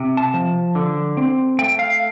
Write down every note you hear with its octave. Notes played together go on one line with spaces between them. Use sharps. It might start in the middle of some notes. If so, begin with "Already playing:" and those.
Already playing: C3
A5
F3
D3
C4
A3 G5
F5